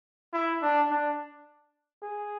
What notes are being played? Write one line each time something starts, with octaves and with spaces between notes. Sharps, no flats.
E4
D4
D4
G#4